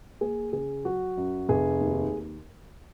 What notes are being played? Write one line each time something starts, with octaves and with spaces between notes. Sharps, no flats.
A#3 G#4
C#3 G#4
F#3 F#4
F#2
F1 G#4
D#2